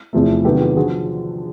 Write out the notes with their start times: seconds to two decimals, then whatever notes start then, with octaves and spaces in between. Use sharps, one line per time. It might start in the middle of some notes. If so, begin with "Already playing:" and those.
0.13 E2 C3 F3 A3
0.45 C3 D#3 F#3 B3 G4 A4
0.60 F4 G4
0.77 D3 F3 F#4 G#4